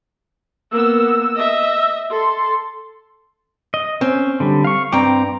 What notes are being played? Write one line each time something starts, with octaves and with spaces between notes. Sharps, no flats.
A#3 B3 E6
D#5 E5
A4 C6
D#5
C4 C#4
D3 G3
F5 C#6
G2 C4 G5 A#5 D6